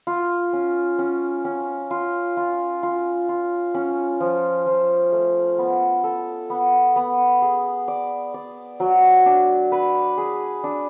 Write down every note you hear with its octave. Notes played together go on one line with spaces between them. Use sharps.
F4
C#4
C#4
C#4
F4
F4
F4
F4
C#4
F3
F3
A3
B3
A4
B3
B3
G#4
D5
D5
F#3
D4
B4
G#4
D4